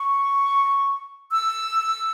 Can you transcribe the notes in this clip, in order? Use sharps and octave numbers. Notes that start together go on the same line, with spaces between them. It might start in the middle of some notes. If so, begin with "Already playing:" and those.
Already playing: C#6
E6